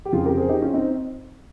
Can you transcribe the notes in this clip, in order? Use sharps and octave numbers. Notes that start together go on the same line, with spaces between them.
G4
F2 C#3 F3 F4 G#4
G4 A#4
G#4 C5
D#4 G4
C#4 F4
C4 D#4